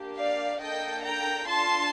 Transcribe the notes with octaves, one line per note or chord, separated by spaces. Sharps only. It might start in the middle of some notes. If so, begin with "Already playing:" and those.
Already playing: A#3 D4 G4
D5 F5
A#3 D4 A4 D#5 G5
G5 A#5
D4 F4 A4 A5 C6